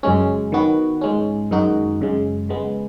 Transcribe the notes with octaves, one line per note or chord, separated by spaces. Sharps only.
F#2 C#3 G#3 C#4
D#3 B3 F#4
G#2 G#3 C#4
F#2 D#3 G#3 D#4 F#4
F#2 C#3 G#3
C#3 G#3 B3